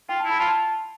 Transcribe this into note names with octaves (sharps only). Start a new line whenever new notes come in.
F4 G5
E4 A5
B5
F4 A5